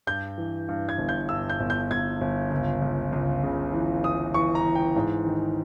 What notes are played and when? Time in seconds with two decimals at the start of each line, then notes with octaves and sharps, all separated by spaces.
0.07 G2 G6
0.38 E3
0.69 G2
0.89 G#6
0.98 G1
1.09 G6
1.29 G2 E6
1.50 G6
1.60 G1
1.70 G6
1.90 G1 G#6
2.21 G1
2.51 C#2
2.82 C#2
3.12 C#2
3.43 C#3
3.73 E3
4.03 E3 D#6
4.34 E3 C#6
4.55 A#5
4.65 E3
4.75 G5
4.96 G#2
5.26 D#3